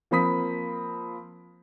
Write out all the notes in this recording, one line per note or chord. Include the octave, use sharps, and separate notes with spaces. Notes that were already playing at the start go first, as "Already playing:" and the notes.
F3 A#3 C4 B5 D#6 B6